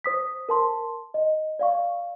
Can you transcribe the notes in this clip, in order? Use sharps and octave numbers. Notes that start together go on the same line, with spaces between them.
C5 D#6 B6
A#4 A5 C6
D#5
D5 F5 C#6